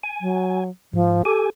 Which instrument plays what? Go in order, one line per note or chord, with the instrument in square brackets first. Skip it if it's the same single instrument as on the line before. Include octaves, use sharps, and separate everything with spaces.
[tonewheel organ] G#5
[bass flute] F#3
[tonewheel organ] G#2 [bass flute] F3
[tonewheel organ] G4 G#5 [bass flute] A4